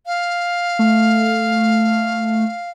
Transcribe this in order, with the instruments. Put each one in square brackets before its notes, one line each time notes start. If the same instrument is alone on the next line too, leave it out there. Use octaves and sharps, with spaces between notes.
[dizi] F5
[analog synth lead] A3